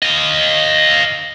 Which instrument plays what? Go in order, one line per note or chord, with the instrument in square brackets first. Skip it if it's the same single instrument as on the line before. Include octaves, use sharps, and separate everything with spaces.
[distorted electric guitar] D#5 F5